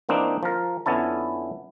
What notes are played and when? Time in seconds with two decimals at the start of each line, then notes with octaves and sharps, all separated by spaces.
0.09 E3 A#3 C4 D4 D#4
0.43 F3 A#4
0.86 F2 D3 B3 C#4 E4 A5